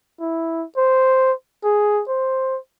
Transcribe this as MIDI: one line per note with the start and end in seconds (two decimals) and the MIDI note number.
0.20 0.65 64
0.77 1.33 72
1.64 2.02 68
2.08 2.58 72